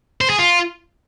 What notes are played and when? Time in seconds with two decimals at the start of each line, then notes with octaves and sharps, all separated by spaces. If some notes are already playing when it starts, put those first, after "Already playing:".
0.21 C5
0.30 G#4
0.39 F4